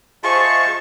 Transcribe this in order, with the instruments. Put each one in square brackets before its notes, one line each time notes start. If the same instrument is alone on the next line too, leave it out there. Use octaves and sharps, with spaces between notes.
[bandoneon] F4 G#4 D#5 [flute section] C5 E5 [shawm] A5 [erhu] C#6